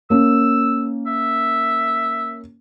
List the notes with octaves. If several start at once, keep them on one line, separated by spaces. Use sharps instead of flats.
A#3 C#4 E6
E5